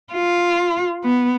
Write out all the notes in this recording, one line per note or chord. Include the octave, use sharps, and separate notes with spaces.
F4
B3